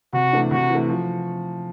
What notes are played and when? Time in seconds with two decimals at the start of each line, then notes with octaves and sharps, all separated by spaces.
0.13 C3 F#4
0.33 E3 A3 D4
0.51 C3 F#4
0.70 E3
0.75 A3
0.89 F3